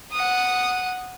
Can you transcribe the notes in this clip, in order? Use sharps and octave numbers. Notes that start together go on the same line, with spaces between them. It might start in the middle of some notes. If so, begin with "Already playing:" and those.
F#5 D#6